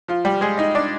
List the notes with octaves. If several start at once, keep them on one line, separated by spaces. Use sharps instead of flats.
F3 F4
G3 G4
G#3 G#4
D#4 D#5
D4 D5